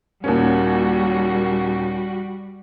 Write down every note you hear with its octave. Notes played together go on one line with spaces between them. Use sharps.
D#2 A#2 G3 C#4 F#4